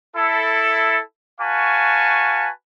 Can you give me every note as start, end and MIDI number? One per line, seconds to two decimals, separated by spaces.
0.16 0.99 64
0.16 0.99 69
1.41 2.49 66
1.41 2.49 71
1.41 2.49 77
1.41 2.49 80
1.41 2.49 81
1.41 2.49 85